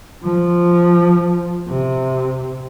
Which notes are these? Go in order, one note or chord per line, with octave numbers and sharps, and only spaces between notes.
F3
C3